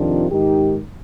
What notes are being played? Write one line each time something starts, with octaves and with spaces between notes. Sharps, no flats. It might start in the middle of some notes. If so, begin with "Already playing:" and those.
Already playing: F2 C3 D#3 D4 F4
G#2 D#3 D#4 G4